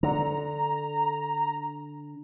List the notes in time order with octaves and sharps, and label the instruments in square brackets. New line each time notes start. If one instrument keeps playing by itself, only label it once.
[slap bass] D3 [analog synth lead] A#5